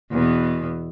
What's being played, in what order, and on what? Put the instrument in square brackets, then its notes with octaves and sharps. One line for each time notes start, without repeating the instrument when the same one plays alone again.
[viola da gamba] E2 B2